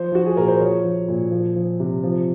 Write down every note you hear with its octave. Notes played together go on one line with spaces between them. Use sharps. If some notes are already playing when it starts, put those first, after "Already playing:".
Already playing: F3 C5
F3 F#4
G#4
A#2 A#4
C5
F3 C#5
F3
A#2
F3
F3
C3
F3